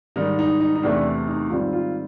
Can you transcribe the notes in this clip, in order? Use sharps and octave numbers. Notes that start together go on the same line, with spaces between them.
G#2 D#3 G3 D#4
D#4
D#4
D#4
E2 C3 E3 A3 D4
D#4
G#2 D#3 G3 C4 F4
F4